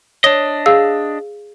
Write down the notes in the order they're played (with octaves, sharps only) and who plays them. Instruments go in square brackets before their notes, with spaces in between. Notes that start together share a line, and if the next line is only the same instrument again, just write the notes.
[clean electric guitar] D4 D#5 [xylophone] C#5
[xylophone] G#4 F5 E6